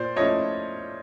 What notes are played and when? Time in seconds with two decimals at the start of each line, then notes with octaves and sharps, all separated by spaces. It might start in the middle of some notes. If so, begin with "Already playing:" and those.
Already playing: A#2 C5 D5
0.16 F3 A3 C#4 E4 C#5 D#5